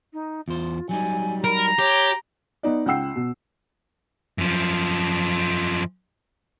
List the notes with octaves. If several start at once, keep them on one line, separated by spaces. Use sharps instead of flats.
D#4
E2 F4 C5
F#3 G3 D#4 G#5
A#4 A#5 B5
G4 C#5
B3 D#4 D5
C#2 F#5 G5 E6 C7
B2
F#2 F3